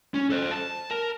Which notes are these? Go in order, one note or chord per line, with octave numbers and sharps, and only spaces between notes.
C#4
A4 C5
A5
A#4